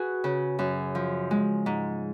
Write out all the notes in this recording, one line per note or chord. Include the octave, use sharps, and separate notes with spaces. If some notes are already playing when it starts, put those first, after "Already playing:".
Already playing: F#4 G#4 B4
C#3
F#2
F3
G#3
G#2